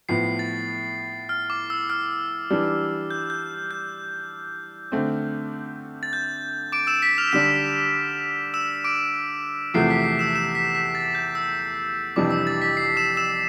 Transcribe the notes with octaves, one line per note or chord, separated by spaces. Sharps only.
A2 F3 B3 C7
A6
F6
D6
E6
F6
E3 G3 D4
G6
G6
G6
D3 A3 C4
A6
G6
D6 D7
E6 E7
B6
F6 F7
D3 G3 D4 E6 E7
E6 E7
D6 D7
E2 C3 F3 A3 C7
B6
C7
E6 E7
E6 E7
B6
B6
A6
G6
E6
F2 C3 E3 G3 D4 D6
E6
A6
B6
C7
E6 E7
E6 E7